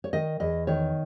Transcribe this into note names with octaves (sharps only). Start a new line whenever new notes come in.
C#5
D#3 D#5
E2 D#5
D#3 C#5